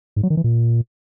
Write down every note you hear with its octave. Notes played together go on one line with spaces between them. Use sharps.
G#2
F#3
D#3
E3
A#2